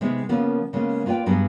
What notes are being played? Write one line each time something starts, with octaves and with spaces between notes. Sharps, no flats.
C3 G#3 B3 D#4
C#3 F3 A#3 B3
C#3 G#3 A#3 B3
A#3 F4 B4 D5 G5
G2 F#3 G3 B3 G#4